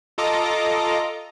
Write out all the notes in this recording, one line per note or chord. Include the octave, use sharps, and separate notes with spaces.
F4 A4 D#5 A#5 D6